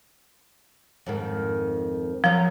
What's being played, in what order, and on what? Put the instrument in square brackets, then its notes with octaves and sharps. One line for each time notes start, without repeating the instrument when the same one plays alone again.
[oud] F2 G#2 D#3
[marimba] F3 [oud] F#3 A#4